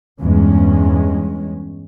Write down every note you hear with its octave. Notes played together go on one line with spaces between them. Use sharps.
E2 G2 G#3 C#4